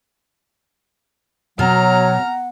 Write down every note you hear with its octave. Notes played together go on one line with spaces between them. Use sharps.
B2 F#3 F#5 A#5 F6